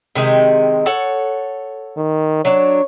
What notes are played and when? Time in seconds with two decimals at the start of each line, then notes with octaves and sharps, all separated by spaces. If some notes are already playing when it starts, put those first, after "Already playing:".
0.15 C3 D#3 G#3
0.86 A4 C#5 F#5
1.97 D#3
2.45 F#3 D4 C#5